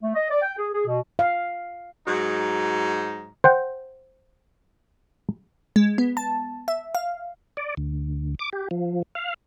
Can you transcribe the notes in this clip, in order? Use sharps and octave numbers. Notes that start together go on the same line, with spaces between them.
A3
D#5
D5
G5
G#4
G#4
B2
F5
G#2 F#3 D#4
C5 F#5 G5
G#3
B3
A5
E5
F5
D5
D2
D6
G4
F3
F5